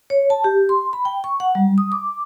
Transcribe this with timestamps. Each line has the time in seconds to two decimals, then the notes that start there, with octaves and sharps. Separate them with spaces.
0.10 C#5
0.30 A5
0.44 G4
0.69 C6
0.93 B5
1.05 G5
1.24 C#6
1.40 F#5
1.55 G3
1.78 D#6
1.92 D6